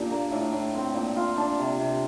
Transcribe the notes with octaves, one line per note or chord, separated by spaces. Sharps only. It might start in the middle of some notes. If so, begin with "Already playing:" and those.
Already playing: A#2 D4 G4
A#3
A2
A2
C4
A#2
F4
D4
C3
C3